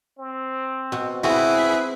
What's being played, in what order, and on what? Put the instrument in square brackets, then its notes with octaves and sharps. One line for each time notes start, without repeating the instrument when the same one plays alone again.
[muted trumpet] C4
[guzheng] B2
[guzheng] B3 C4 F#4 [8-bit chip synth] E4 G#4 E5 [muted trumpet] B4